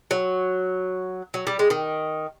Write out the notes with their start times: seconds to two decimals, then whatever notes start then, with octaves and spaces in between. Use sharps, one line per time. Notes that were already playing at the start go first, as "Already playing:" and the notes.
0.11 F#3
1.34 F#3
1.47 G3
1.59 G#3
1.70 D#3